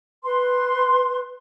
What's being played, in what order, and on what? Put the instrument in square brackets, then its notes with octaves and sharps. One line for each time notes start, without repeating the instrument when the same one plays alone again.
[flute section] B4 C6